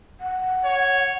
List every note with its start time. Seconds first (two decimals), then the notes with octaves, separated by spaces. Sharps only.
0.21 F#5
0.64 C#5